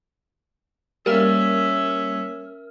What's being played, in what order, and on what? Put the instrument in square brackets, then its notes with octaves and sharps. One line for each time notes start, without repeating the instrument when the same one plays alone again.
[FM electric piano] G3 A#3 [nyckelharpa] C#4 E5 [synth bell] A#4 F6